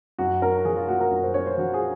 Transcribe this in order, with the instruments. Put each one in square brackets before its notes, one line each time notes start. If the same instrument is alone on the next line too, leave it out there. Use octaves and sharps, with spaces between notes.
[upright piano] F#2 F#4
C#4 A#4
F3 G#4
F4
A#3 F#4
A#4
F#2
C5
C#4 C#5
C5
F3 F#4
G#4